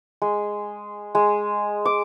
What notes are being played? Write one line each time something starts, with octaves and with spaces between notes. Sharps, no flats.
G#3
G#3
D6